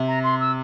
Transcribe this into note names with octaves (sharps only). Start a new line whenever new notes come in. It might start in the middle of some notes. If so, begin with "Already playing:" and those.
Already playing: C3
A#5
C6
E6